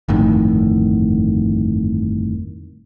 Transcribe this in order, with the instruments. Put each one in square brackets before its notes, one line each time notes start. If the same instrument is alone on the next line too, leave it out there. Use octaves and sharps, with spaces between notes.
[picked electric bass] G1 F2 A2 D#3